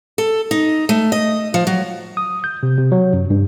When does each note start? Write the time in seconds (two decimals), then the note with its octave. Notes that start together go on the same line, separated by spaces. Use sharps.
0.18 A4
0.51 D#4
0.89 A3
1.12 D#5
1.54 F3
1.67 F#3
2.17 D#6
2.44 G6
2.63 C3
2.78 C3
2.92 F#3
3.13 F#2
3.30 G2